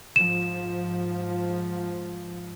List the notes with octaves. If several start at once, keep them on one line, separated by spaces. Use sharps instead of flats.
G#2 F3 E7